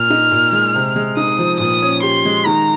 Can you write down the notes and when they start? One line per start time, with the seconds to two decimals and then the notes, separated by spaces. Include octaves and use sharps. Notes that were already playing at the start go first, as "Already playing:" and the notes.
Already playing: A#2 F6
0.10 D#4
0.32 A#2
0.53 G#3
0.75 C3
0.96 G#3
1.17 D#4 D#6
1.39 F3
1.60 A#2 D#6
1.82 C#4
2.03 G4 C6
2.25 G#3
2.45 D#3 A#5